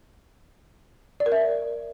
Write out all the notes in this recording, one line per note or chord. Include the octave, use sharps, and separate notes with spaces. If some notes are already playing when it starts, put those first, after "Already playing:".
D5
A#4
E5